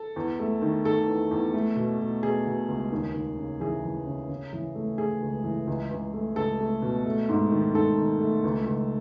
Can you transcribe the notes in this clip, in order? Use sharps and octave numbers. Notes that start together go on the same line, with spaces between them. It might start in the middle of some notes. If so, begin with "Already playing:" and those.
Already playing: A4
E2
A3
D#3
D#3 A4
E2
E2
A3
B2
B2
B2 G#4
B2
C#2
D#2
D#2
C#3
E3 G#4
E3
C#3
C#3
E3
A3
A3 G#4
C#2
E3
C#2
C#2
A3
C#2 A4
A3
B2
A3
G#2
D#3
G#2 A4
D#3
A3
C#2
C#2